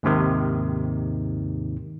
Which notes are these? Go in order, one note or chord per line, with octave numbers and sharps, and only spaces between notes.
D#2 G#2 C3 D#3